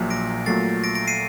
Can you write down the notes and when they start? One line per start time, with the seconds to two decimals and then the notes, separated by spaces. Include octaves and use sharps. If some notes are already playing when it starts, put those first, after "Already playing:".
Already playing: A#1 A#2 F#3
0.10 A#6 D7
0.46 A#2 F#3 A3 A6 C7
0.84 A#6 D7
0.95 A#6 D7
1.07 C7 D#7